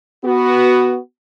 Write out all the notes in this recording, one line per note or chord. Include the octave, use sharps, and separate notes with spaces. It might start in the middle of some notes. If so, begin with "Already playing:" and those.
B3 F#4